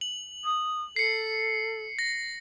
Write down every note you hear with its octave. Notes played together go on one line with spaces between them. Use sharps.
F#7
D#6
A4 C7 C#7
A#6